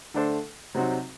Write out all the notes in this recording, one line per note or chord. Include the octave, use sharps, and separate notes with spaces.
D3 A3 D4 A4 C5
C3 F#3 C4 D#4 F#4